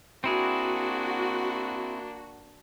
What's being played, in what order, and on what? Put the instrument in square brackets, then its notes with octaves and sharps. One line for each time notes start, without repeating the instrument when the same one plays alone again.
[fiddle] A#3 D4 [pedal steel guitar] C4 E4 G#4 [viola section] F#4